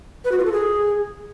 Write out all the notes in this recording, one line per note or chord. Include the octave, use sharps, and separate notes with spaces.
B4
F#4
F4
A4
G#4